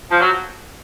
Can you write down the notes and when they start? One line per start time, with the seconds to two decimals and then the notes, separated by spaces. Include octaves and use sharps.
0.09 F3
0.20 F#3